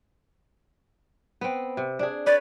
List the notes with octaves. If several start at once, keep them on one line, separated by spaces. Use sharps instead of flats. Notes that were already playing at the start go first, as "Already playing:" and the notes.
B3 C4
C3
D4 G#4
B4 C#5 D5